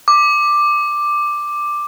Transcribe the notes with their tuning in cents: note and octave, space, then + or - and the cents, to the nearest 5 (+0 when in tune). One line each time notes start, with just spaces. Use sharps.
D6 +10